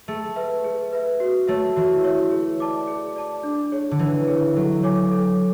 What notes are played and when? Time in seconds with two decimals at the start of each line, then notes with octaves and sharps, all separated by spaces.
0.08 A3 G#4
0.36 B4 E5
0.64 G#4
0.93 B4 E5
1.20 F#4
1.48 A3 C#5 E5
1.76 E3 F#4
2.04 C#5 E5
2.31 G#4
2.60 D5 A5 D6
2.88 G#4
3.16 D5 A5 D6
3.43 D4
3.72 G#4 C#5
3.91 D3
3.99 E3 D4
4.28 G#4 C#5
4.55 F#3 A4
4.83 C#5 G#5 D6
5.11 A4